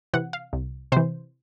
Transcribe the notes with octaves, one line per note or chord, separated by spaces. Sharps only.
C3 E3 F#5
F5
C2
C3 E3 C5